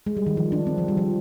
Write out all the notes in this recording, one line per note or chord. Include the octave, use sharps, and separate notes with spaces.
G#3
G3
D#3
F3
D4
C4
F3
G3
F3